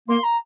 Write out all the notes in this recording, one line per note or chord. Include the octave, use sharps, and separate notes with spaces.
A#3 C6
A#5